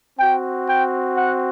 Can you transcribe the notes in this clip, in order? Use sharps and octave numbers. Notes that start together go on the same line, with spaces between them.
C4 F#4 G5
G5
F#5